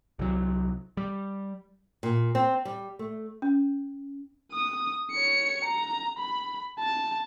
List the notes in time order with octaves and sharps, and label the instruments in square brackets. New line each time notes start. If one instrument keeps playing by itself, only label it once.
[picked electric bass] C2 F#3
G3
[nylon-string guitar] A#2
C4
G3
A3
[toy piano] C#4
[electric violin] D#6
C#5 C#7
A#5
B5
A5